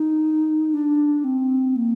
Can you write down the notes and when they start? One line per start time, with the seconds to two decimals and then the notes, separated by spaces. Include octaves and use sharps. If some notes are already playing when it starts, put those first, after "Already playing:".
Already playing: D#4
0.74 D4
1.24 C4
1.76 A#3